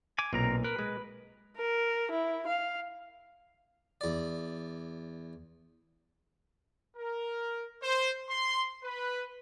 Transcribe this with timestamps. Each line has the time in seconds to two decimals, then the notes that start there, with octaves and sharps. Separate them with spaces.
0.18 G#5 D6
0.33 B1 A#2 C4 A#4 A#5
0.64 A#4 B4
0.79 G#3
1.57 A#4
2.11 E4
2.47 F5
4.01 E2 D5
6.96 A#4
7.83 C5
8.30 C6
8.84 B4